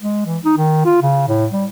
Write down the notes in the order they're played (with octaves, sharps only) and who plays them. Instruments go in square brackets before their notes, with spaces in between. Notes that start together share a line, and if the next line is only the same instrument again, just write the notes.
[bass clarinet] G#3
E3
D#4
D#3
F4
C#3
A2
G3